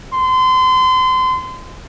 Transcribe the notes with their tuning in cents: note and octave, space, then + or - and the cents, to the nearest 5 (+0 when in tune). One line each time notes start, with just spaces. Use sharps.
C6 -30